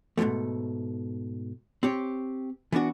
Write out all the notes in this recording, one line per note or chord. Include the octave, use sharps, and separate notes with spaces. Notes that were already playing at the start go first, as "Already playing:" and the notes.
G#2 B2 E3 F3 A3
C4 G4 C#5
E3 B3 D4 F#4